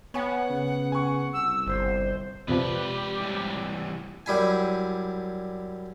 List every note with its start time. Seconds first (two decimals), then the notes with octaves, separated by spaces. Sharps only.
0.14 B3 C#5 F#5 G#5
0.50 C#3
0.92 G#5 C#6
1.33 C2 E6
1.66 G1 C5
2.48 F2 C3 F3 G#3 G4 B4 D5
3.20 E3 G3
4.26 F#2 G3 E4 G#5